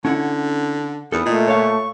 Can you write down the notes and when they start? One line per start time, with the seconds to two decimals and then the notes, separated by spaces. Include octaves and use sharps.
0.05 D3 C#4 E4 F#5
1.12 E2 E4 A4 D#6
1.26 A#2 A3 F4 D#5
1.48 C#5 E5 F5 C#6